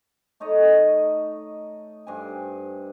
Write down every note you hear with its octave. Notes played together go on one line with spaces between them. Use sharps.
A3 D#4 C#5 D#5
G2 C5 G#5